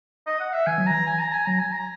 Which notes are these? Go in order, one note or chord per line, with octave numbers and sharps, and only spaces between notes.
D#5
F#5
E5
E3 G#5
F#3
E3 A#5
G#5
A#5
G#5
F#3 A#5
G#5
A#5